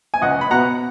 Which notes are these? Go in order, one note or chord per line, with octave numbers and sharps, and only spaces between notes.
G#5
C#2 D#5 F#5
B5
B2 F#5 A#5